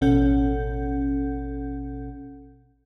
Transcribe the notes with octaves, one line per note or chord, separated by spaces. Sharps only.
A1 B2 C#4 A4 F#5 G6